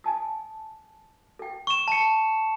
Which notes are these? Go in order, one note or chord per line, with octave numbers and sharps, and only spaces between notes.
G#5 A5 D#6
A4 G5
C#6 E7
A5 C#7